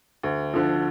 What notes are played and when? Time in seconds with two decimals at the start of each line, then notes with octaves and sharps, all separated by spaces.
0.23 D2
0.53 D3 F3